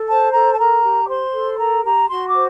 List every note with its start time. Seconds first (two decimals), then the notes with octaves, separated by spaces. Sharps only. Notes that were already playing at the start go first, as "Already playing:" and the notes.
Already playing: A4
0.08 C5 A5
0.34 A4 A#5
0.53 A5
0.59 A#4 A#5
0.84 G4
1.05 D6
1.09 C5 C6
1.34 A4
1.59 A#4 A#5
1.84 G4 A#5
2.09 F#4 C6
2.26 D6
2.34 C5